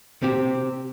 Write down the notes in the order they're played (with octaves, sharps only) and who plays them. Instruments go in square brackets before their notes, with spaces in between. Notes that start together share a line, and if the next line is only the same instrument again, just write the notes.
[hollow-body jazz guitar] C3 C4 G4